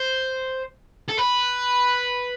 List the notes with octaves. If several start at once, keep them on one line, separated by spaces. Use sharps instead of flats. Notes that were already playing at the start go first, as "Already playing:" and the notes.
Already playing: C5
A4
B4